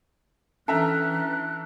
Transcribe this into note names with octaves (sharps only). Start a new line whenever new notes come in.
E3 C#4 D4 A4 E5 A#5 F6 F#6